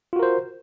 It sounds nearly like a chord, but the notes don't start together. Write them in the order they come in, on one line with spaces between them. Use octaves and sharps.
F4 F#4 A#4 C5